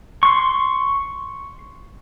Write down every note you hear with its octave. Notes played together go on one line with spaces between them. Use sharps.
C6 C#6